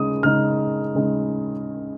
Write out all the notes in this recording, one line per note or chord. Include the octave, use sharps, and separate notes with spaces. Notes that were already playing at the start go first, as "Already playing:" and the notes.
Already playing: C#3 G#3 D#4 D#6
C#3 G#3 D#4 F6
C#3 G#3 D#4